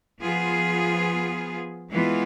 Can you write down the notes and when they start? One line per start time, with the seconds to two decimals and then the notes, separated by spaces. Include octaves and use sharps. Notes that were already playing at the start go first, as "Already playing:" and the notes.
0.21 F3 B3 F4 G#4
1.90 E3 G#3 B3 F4